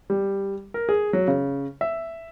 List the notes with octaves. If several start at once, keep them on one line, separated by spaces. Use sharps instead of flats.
G3
A#4
G#4
F#3
C#3
E5